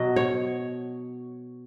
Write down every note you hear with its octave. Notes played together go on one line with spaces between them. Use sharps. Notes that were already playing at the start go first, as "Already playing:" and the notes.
Already playing: B2 F#3 D#5
C#5